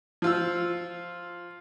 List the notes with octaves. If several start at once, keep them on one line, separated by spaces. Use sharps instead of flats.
F3 F4 E6